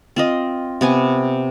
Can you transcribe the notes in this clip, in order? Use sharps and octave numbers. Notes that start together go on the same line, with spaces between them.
C4 F4 D#5
C3 B3 G#5